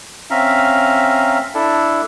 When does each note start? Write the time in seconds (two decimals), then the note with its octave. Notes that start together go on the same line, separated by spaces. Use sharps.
0.30 C4 C#4 E5 F5 A#5
1.55 D4 E4 A4